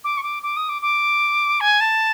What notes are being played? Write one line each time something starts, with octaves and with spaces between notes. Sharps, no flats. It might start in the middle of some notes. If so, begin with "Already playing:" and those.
D6
C#6
D6
D6
D#6
D6
D6
G#5
A5